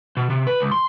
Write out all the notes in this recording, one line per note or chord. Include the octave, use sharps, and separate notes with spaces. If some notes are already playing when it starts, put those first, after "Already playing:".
B2
C3
B4
C#2
C6